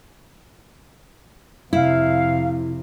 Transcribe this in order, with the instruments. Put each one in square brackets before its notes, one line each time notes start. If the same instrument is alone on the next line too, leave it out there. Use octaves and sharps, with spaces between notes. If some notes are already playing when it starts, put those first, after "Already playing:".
[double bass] F2 C3 [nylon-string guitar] E4 [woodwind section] F5